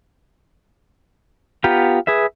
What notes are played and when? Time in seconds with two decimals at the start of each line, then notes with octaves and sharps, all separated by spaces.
1.64 B3 F4 G4 A#5
2.07 G#4 B4 E5